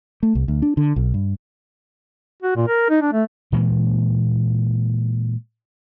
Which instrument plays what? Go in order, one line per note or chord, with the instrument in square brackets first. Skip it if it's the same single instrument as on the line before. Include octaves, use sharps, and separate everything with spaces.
[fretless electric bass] A3
C2
D2
D4
D3
B1
G2
[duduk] F#4
A#2
A#4
D#4
D4
A3
[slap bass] A#2 E3 G#3 A#3